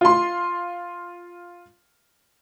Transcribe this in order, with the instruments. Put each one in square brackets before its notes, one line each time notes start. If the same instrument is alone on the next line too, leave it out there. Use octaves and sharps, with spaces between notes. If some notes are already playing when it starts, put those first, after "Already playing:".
[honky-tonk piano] F4 C6